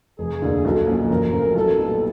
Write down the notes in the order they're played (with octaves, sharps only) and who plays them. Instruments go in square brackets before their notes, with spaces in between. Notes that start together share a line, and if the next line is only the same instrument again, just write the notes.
[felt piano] F1 [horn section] G#4
[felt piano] D#2 D3
[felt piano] B1 [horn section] A4
[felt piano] A#2 F3 A#3 C#4
[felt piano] F#1 [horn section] A#4
[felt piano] F#2 C#3 F3 A3
[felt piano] B1 [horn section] A4
[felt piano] A#2 G3 B3 D#4